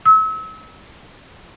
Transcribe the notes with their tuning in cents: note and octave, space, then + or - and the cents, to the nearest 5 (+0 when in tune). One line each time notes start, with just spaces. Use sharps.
E6 -35